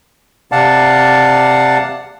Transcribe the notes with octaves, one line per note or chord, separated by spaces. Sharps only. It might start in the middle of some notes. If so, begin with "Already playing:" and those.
C3 D5 F5 F#5 A5